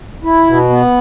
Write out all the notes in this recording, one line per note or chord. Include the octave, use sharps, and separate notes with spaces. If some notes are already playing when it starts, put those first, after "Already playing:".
E4
B2
B3